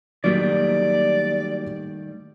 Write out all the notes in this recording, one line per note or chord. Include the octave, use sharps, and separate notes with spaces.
D#3 F#3 G3 A3 A#3 F#4 D5